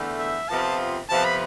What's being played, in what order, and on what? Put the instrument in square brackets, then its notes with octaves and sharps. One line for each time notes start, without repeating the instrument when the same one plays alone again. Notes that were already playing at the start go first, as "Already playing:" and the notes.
Already playing: [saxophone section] E2 D3 A3
[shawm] E5
[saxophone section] F2 C3 F3 B3 F4 [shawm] A5
[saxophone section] F2 C3 F3 B3 F4 [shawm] A5
[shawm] B5